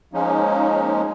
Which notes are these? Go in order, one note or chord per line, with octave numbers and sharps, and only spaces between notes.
F3 G#3 A#3 C#4 D#4